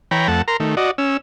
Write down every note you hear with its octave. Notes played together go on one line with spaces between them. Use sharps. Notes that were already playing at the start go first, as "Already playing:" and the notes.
E3 C#5 G5 A#5 B5
F2 A3 F#5 A5
A#4 A#5 C6
D#3 A3
F#4 D5 D#5
C#4 E6